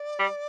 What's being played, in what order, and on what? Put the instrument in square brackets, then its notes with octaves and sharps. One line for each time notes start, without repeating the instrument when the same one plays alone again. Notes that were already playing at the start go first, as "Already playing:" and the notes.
Already playing: [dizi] D5
[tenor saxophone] G3